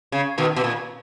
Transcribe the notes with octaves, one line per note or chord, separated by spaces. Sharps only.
C#3
B2 D#3
B2
A#2